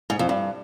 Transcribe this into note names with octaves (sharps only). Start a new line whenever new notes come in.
G#2
F2
G2